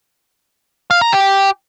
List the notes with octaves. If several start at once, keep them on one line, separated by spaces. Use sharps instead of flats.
F5
A#5
G4